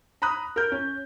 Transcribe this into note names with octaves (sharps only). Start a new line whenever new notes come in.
A#5 B5 D#6 F#6
A#4 G6
C#4